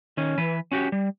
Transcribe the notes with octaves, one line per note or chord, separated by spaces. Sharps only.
D#3 C#4
E3 B4
C#4 F#4 G4
G3